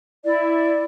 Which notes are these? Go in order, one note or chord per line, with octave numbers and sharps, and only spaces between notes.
E4 D5